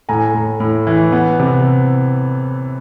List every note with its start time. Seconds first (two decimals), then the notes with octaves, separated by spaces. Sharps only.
0.09 A2 G#5 A#5
0.34 A2
0.60 A2
0.87 E3
1.12 B3
1.40 C3